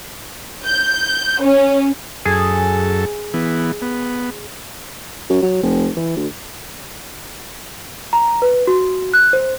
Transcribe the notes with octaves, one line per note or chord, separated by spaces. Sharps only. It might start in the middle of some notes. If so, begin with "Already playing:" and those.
G6
C#4
F#2 G#4 A4
E3 B3
B3
F#2
F#3
F1
E3
D2
A#5
B4
F#4
F#6
C5